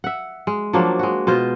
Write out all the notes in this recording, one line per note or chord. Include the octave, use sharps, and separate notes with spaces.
E5 F#5
G#3
F3 F#3 A#3 D4
G#3 F#4
B2 F4 C5 D#5